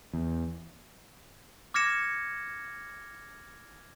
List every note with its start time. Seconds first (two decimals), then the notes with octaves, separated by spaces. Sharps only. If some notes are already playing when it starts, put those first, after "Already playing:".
0.13 E2
1.74 D6 F6 G#6 A#6 C#7 E7